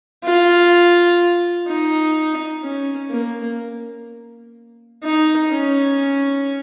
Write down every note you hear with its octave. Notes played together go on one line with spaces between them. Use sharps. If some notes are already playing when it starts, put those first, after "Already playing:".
F4
D#4
C#4
A#3
D#4
C#4